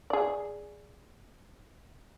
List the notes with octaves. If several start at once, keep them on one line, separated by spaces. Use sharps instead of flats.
G#4 D5